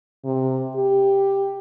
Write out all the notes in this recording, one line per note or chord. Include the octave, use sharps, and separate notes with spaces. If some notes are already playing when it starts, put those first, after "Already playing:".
C3
G4